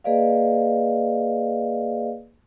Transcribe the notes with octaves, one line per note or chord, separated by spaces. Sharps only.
A#3 G#4 B4 D5 D#5 F5